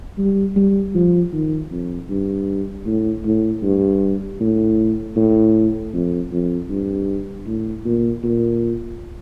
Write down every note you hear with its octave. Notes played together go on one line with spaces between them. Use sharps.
G3
G3
F3
D#3
F2
G2
A2
A2
G2
A2
A2
F2
F2
G2
A2
A#2
A#2